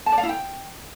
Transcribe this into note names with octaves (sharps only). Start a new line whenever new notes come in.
A5
D5
F5
E4
G5